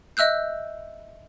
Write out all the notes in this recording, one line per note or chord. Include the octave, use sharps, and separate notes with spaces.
D#5 E5 E6 F#6 G6